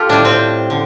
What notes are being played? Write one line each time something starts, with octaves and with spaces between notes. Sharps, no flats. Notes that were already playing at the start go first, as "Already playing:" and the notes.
Already playing: F4 G4 A4
A2 G3 D4
C4
D3